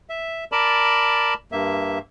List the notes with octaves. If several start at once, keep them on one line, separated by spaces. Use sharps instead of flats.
E5
A#4 D5 A5 B5
G2 A#3 E5